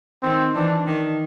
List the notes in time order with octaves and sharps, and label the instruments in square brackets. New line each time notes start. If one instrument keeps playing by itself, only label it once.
[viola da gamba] D#3 [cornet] C4
[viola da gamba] E3 [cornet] D4
[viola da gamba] D#3